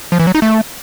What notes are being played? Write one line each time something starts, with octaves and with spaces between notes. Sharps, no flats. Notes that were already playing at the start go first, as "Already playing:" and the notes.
F3
E3
F#3
D#4
A3